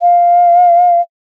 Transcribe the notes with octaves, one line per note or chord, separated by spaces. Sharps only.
F5